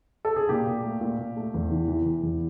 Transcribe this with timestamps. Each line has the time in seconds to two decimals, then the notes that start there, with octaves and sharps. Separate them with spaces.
0.25 A4
0.36 G#4
0.49 A#2 G4
0.67 A#2
0.83 A3
1.01 A#2
1.18 A#2
1.37 A3
1.54 E2
1.71 E3
1.88 E3
2.06 E3
2.23 E2